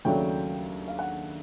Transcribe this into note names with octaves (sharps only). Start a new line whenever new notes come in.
D#2 C#3 F#3 A3 D4 G5
F5
F#5